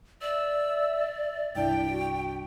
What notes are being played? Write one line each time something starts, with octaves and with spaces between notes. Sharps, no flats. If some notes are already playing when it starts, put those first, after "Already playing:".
D5 E5 E6
C2 G2 D4 E4 G5
F#4